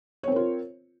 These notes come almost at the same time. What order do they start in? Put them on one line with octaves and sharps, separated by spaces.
C#5 C4 A#4 F4